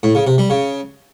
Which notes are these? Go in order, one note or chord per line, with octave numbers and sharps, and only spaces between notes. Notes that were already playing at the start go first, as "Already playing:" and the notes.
A2
C#3
C3
G3
C#3